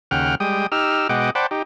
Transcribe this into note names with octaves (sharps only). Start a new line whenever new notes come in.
D#2 C#3 F#5 G5 F6
G3 G#3 G5 D#6
D#4 G4 E6 F6
B2 G#3 D#5 F#5 G5 D6
C5 D5 F#5 G5 A5 B5
D#4 G4